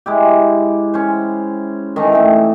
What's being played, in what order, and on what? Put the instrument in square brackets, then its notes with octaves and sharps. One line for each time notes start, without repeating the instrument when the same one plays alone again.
[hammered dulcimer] G#3 E4 G4
C#4 C5
D#3 E3 A3
A3 C4